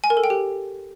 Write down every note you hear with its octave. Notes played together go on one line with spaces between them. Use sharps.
G#5
A#4
A4
G5
G4